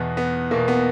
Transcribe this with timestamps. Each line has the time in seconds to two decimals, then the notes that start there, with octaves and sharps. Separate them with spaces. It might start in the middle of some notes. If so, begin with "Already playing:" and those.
Already playing: E2 B2 B3
0.17 B3
0.51 E2 B2 A#3
0.68 B3